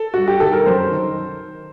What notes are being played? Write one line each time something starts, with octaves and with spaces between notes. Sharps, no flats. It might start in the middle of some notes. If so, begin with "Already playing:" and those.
Already playing: A4
G2 F#4
G4
D#3 A4
A#4
F#2 C5
D#3